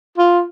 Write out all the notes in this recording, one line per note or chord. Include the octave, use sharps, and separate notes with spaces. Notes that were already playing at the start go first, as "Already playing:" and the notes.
F4